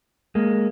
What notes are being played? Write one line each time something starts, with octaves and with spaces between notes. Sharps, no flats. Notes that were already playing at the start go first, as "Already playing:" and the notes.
G#3 A#3